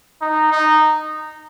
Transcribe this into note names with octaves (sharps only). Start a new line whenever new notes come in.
D#4
D#4